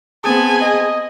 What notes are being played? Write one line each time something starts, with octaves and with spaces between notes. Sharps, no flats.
B3 C4 G#4 G#5 A5
D#5